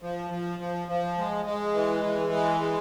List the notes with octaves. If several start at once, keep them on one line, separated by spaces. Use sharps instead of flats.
F3
F3
F3
F3
G#3
G#3
E3
E3
G#3
G#3